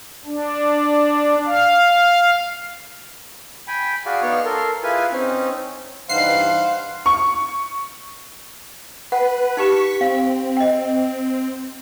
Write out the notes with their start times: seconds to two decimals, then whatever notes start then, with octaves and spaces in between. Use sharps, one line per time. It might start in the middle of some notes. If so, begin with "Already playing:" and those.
0.25 D4
1.46 F5
3.68 G5 G#5 B5
4.06 F#4 G#4 D5 F5
4.22 B3 D#4 C#5 D5 F5 C#6
4.45 A4 A#4 C6
4.83 E4 F4 G#4 B4 G#5
5.12 C4 C#4 D#4
6.09 G2 E3 D#4 C5 F5 F#5 C7
7.06 C#6
9.12 B4 F#5
9.57 D#4 G4 B4 C#6 B6
10.01 C4 F5
10.57 D#5 G5